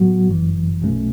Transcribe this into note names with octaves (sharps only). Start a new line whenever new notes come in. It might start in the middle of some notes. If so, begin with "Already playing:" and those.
Already playing: A2 F#3 B3 F#4
G1 F#2 E3
B1 B2 A3 C#4